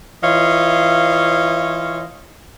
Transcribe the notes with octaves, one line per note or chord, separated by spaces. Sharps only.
E3 F4 C#5 D#5 F5